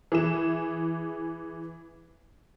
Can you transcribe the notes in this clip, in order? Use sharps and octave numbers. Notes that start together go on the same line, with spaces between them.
E3 G#4 E7